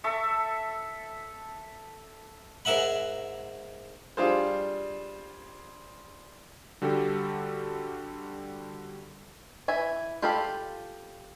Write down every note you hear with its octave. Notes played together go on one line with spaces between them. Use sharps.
A4 E5 C#6
G#2 A#4 E5 F#5 B5
G3 D4 F4 G#4 C5
D3 G3 F#4 G4 A4
E3 E5 G#5
F4 G4 A4 F5 B5